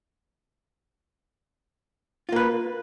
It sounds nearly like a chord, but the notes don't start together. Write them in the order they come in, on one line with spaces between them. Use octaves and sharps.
F4 A#3 B4